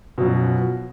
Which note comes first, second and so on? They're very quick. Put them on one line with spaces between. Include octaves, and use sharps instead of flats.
B2 F#2 F3